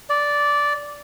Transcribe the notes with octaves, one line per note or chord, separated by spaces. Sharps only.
D5